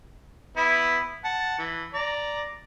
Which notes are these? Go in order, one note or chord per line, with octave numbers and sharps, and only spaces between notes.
B3 E4
F#5 A5
E3
D5 A#5